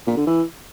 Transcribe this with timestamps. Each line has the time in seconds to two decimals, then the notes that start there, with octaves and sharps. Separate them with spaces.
0.07 A#2
0.17 D3
0.27 E3